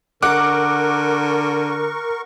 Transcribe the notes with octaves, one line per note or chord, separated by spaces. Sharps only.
D3 A#4 F#5 C#6 D6